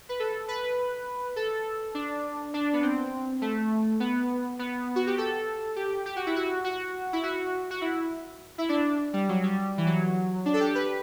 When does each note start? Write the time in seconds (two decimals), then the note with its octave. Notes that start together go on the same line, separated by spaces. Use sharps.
0.09 B4
0.20 A4
0.48 B4
1.36 A4
1.95 D4
2.54 D4
2.73 B3
2.83 C4
3.42 A3
4.00 B3
4.59 B3
4.96 F#4
5.07 G4
5.18 A4
5.76 G4
6.06 G4
6.16 F#4
6.26 E4
6.36 F#4
6.64 F#4
7.13 E4
7.23 F#4
7.71 F#4
7.81 E4
8.58 E4
8.69 D4
9.13 G3
9.29 F#3
9.43 G3
9.78 E3
9.86 F#3
10.46 D4
10.54 A4
10.60 G4
10.75 B4